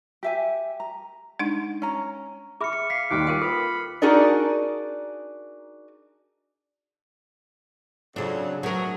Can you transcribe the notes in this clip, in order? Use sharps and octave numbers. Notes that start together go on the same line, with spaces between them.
G4 E5 G#5
A#5
G#3 D4 D#4
C#4 A#5
G#4 E5 B5 D6 F6 C#7
C#7
F5 B6 C7
D#2 D#3 G3 D6 F6 F#6
F4 A#4 F5 G5
A4 B4 B5
D4 D#4 F#4 G#4 A#4 D5
F2 C#3 F#3 D4
F#3 A3 F#4 G#4 A#4